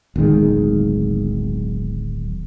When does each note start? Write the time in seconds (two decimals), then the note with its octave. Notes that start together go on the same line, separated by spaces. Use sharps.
0.16 D1 B1 D#3 G#3